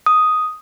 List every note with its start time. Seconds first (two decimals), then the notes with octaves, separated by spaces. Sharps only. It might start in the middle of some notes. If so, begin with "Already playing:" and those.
0.06 D#6